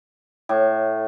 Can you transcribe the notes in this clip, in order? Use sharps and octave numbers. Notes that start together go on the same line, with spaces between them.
A2